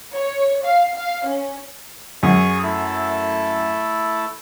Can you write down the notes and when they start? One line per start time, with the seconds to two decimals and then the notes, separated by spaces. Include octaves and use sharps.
0.15 C#5
0.65 F5
0.96 F5
1.27 C#4
2.23 F#2 G#4 C#6 D#6
2.63 A3 E4 A4